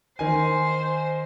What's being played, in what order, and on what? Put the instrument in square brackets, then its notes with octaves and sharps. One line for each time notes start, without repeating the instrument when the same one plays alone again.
[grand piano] D#3 G#5 [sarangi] C5